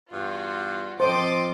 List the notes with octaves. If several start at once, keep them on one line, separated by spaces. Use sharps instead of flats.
E2 G2 F4 F#4
F3 C4 A4 C5 D#5 C6 D6